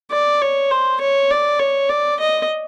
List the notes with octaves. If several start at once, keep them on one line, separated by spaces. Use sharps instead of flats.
D5
C#5
C5
C#5
D5
C#5
D5
D#5